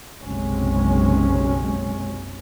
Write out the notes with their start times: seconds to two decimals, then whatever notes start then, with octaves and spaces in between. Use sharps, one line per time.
0.22 F#1 B1 C3 G#3 C#4